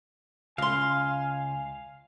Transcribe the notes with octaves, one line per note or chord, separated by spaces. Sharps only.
C#2 F5 G#5 C6